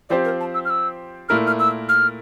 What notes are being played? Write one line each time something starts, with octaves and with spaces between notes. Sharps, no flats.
F3 C4 G4 C5 D5
A#4
A5
E6
F6
E6
A#2 A3 E4 A#4 F6
F6
E6
F6